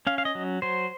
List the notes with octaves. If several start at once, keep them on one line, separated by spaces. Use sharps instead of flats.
C#4 F5
F5
D#5
F#3
F#3 C5